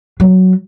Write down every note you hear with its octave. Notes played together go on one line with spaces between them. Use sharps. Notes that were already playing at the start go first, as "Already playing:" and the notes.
F#3